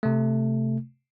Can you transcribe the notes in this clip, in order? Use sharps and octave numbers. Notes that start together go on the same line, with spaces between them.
C3 A3